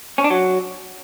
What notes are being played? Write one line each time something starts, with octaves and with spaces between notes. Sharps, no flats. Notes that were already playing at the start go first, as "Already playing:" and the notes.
C#4
D4
F#3